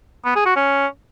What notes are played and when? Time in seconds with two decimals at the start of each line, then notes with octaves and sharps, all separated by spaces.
0.25 B3
0.35 G#4
0.46 F#4
0.56 C#4